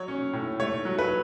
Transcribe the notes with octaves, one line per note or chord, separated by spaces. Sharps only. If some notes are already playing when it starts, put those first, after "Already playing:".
Already playing: F#3 C#5
C#4
A2
A3 C#5
F#3
B4